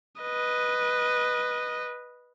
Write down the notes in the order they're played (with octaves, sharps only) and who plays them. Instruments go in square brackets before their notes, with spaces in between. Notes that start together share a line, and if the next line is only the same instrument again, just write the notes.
[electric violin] B4 D#5